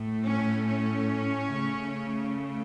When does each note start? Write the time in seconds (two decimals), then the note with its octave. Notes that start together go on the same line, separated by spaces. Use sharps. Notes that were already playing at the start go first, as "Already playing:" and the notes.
Already playing: A2 A3
0.23 C#4
0.66 C#4
1.53 C#3 A3